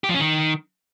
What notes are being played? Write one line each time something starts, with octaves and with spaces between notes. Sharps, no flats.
G4
F3
C#4
D#3